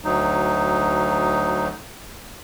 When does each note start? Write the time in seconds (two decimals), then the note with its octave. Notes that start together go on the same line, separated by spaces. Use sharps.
0.05 D2 F#3 D#4